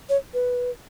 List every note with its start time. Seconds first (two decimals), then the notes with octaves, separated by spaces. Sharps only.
0.09 C#5
0.34 B4